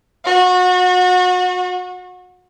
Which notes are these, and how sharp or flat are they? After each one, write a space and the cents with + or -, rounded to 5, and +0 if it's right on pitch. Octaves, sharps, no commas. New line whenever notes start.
F#4 -30